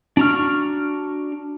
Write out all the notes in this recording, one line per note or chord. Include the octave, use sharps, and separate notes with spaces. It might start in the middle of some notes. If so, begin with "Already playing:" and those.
D4 F#4 A#5 C#6 F6